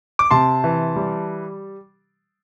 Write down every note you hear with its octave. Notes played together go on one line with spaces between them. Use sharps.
D6
C3 A5 C6
E3
G3